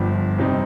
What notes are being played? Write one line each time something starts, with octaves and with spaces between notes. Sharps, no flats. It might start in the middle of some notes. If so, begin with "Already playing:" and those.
Already playing: G1 G2 F3
F2 C3 G3 C4 D#4